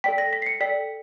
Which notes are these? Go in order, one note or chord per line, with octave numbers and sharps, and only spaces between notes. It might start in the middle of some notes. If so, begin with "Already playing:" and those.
A4 D5 G5 B6
A#6
B6
C7
C#7
A4 D5 G5 B6